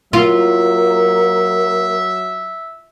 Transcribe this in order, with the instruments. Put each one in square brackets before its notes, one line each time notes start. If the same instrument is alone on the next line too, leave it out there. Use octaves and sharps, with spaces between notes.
[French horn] F#3 [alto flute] A#3 [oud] F4 [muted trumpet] E5